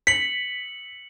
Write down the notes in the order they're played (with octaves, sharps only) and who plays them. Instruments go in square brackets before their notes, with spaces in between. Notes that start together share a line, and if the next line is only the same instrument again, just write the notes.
[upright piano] B6 [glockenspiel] C#7 F#7